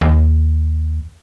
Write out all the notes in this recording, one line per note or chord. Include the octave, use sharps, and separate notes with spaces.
D#2